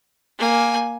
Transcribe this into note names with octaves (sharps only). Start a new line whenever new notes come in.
A#3 G#5